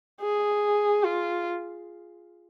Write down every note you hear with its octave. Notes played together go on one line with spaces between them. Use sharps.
G#4
F4